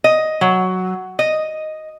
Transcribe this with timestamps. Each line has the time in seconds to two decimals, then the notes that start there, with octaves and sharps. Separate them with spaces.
0.04 D#5
0.41 F#3
1.19 D#5